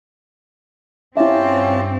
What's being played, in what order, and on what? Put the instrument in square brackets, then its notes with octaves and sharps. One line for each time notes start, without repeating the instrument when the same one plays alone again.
[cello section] G2 C4 [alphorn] C#4 [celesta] E4 E5 [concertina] F4 G4 A5